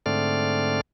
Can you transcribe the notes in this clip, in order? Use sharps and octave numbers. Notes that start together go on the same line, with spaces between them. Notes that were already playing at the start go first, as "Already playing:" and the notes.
G#2 D3 A3 C4 D5 F6